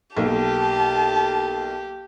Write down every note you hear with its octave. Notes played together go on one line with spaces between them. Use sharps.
B1 A#3 G4 A5